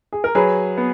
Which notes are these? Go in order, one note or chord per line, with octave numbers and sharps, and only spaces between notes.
G#4
A#4
F#3 G#4 B4
B3